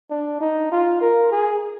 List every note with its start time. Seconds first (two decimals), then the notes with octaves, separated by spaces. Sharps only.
0.11 D4
0.40 D#4
0.72 F4
1.01 A#4
1.32 G#4